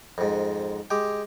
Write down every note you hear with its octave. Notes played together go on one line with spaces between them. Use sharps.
F2 G#2
G#3 G4